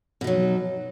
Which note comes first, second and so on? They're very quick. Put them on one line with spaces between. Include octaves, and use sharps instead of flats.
B2 D#4 F#3